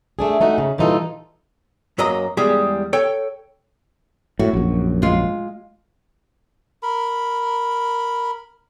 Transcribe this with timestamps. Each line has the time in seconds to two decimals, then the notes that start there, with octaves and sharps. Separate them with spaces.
0.19 A3 D4 G#4
0.41 A3 D#4 F#4
0.58 C#3
0.78 A#2 E3 G3 D#4 F4 A4
1.98 F#2 F#3 A#3 D#5 A#5
2.37 E2 G3 G#3 G4 G#4 G5
2.93 A4 C#5 G5
4.39 A2 F#4
4.53 A#1 F#2
5.02 G#3 F4
6.83 A#4 B5